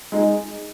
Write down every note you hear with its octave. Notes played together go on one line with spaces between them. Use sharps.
G#3 D#4 G#4